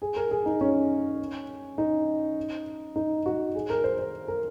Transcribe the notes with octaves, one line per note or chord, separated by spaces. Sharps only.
G#4
A#4
G#4
D#4
C#4
D#4
D#4
F#4
G#4
A#4
C5
C5
A#4